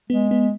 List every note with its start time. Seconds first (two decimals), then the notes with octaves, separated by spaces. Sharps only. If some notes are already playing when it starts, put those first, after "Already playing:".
0.10 G#3 B3
0.31 B3